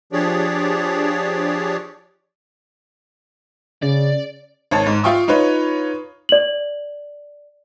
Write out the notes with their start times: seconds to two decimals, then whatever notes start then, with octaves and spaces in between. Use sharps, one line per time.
0.13 F3 D4 G4 G#4 C#5 D5
3.82 C#3 D5
4.71 G#1 C#5 A5
4.86 G#2
5.03 F4 E5 F5 G5 C#6 D#6
5.28 D#4 F4 B4 C#5
6.29 D5 F#7